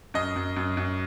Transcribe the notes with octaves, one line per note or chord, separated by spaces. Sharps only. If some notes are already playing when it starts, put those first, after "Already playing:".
F#2 D#5
F#2
F#2
F#2